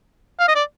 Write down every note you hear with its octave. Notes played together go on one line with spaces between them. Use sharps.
F5
D#5
D5